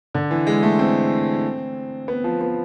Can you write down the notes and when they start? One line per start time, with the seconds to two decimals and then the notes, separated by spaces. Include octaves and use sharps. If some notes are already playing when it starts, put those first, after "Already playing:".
0.14 D3
0.31 E3
0.47 G#3
0.63 A3
0.79 C4
2.08 B3
2.24 F3
2.41 B3